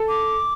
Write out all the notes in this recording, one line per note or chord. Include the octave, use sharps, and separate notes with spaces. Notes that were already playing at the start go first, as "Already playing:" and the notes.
Already playing: A4
D6